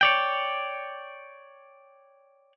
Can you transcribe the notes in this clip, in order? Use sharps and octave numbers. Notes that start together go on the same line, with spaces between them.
C#5 D5 G5